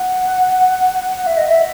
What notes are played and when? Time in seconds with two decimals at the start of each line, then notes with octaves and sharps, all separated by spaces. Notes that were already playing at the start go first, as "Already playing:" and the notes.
Already playing: F#5
1.26 E5
1.37 D#5
1.47 E5